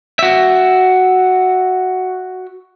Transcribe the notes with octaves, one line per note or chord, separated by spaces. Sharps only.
F#4 E5